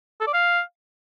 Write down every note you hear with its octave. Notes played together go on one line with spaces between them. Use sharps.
A4
D5
F5